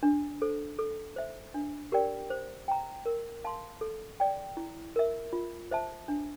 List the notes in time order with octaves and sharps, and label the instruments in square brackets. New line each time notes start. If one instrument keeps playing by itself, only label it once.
[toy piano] D4
A4 C5
A4
C5 E5
D4
G4 A#4 D5 G5
C5
G5 A#5
A#4
F5 A5 C6
A4
D5 G5
E4
A#4 E5
F4
C5 E5 A5
D4